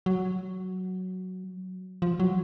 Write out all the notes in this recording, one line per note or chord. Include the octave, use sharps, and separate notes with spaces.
F#3
F3
F#3